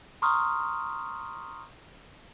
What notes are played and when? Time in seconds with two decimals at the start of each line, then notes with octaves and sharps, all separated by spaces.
0.22 A#5 C6 C#6 D#6 F6